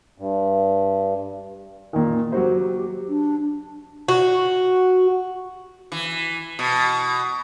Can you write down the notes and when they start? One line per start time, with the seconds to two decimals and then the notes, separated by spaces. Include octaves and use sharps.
0.18 G2
1.93 A#2 D#3
2.32 F#3 F#4 G4 C5
3.09 D4
4.08 F#4
5.92 E3
6.59 B2